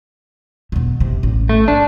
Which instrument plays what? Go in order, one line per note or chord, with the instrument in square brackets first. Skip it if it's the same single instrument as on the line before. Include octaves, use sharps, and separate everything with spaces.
[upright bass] E2 B2
E2 C3
A1
[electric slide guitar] A3
[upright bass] G#2 [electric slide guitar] D4